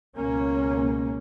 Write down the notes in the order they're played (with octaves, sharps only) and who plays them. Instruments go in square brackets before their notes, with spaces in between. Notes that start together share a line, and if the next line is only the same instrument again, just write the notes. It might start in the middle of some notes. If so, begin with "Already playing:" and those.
[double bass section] C#2 B2 A#3 C#4